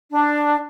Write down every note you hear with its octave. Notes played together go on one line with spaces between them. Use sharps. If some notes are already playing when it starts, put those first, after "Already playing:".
D4